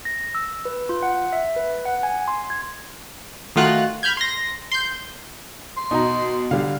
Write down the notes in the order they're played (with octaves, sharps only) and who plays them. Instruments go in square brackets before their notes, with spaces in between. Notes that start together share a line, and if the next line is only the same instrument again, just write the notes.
[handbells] A#6
E6
B4
F4
F#5
E5
B4
F#5
G#5
C6
G#6
[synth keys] D#3 A3 F4 F#4 F#6
B5 F6 G6 G#6
C6 A#6
C6 G6
[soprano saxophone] C6
[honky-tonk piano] B2 [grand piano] D#4 A#5
[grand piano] D3 G3 [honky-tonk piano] F5